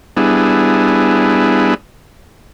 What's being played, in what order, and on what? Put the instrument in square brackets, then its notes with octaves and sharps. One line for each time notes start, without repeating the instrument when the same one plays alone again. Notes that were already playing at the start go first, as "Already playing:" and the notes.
[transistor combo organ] G3 B3 D4 E4 G#4